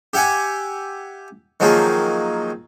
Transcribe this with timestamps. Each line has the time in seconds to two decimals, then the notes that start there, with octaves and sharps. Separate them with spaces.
0.14 G4 E5 F#5 G#5 D6
1.60 D#3 F3 F#3 A#3 G#4